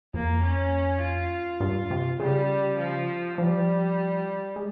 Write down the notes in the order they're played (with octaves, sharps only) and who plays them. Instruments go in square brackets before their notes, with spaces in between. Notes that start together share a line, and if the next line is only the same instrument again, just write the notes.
[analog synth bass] F2 [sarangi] A#3
[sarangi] C#4
F4
[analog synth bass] G2
C3
[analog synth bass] C#3 [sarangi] G3
[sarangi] F3
[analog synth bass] F3 [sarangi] G3
[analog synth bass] G#3